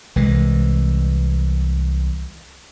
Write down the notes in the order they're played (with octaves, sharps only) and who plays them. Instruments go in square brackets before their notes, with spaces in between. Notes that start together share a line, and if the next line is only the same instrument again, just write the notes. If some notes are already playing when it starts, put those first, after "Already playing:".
[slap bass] C2 E3 G#3